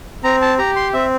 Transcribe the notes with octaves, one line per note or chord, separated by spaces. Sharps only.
C4 A#5
A5
G4 A#5
C6
C4 E5